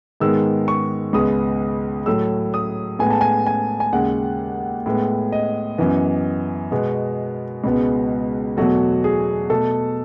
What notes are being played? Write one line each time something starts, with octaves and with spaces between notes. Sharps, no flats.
G#2 D#3 G#3 B3 E6
C#6
C#2 C#3 G#3 B3 D#6
A2 F#3 A3 E6
D#6
A2 G#3 B3 G#5
A5
G#5
G#5
G#5
D#2 C#3 G#3 F#5
A2 G#3 B3
D#5
F#2 E3 B3
B2 G#3 B3
C#2 B2 G#3 B3
E2 B2 F#3 A3 F#4
G#4
B2 A3 A4